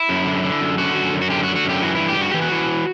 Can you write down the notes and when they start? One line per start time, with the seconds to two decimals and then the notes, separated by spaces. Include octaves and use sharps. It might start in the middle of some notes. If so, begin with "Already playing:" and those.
Already playing: E4
0.09 F#2
0.26 D3
0.43 D3
0.60 F#2
0.78 D3 F#4
0.95 F#2
1.13 F#2
1.22 F#4
1.30 D3 G4
1.43 F#4
1.48 D3
1.56 F#4
1.65 F#2 G4
1.82 E3 F#4
1.95 G2 E4
2.08 G4
2.17 G2 F#4
2.31 E3 G4
2.42 F#4
2.52 E3